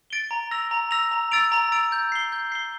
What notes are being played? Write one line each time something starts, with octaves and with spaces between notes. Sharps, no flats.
A6 D7 G7
A#5
E6 A#6 F7
A#5
E6 A#6 F7
A#5
E6 A6 D7 F7
A#5
E6 A6 D7 F7
G6
C7 G7
G6
C7 G7